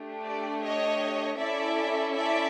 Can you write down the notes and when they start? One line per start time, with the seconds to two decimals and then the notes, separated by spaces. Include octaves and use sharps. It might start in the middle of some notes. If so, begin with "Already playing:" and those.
Already playing: A3 D4 G4
0.24 D5
0.62 C#5 D#5
1.38 C#4 E4 A4 D5 E5
2.14 D5 E5